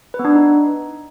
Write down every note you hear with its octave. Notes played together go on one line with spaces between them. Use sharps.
B4
B3
D4
B4
D#4